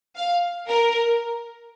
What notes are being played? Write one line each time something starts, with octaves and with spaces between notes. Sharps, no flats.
F5
A#4